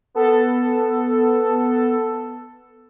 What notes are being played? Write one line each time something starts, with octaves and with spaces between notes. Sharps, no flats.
B3 A4